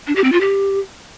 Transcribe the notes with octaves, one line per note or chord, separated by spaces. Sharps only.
D4
G4
C4
F4
G4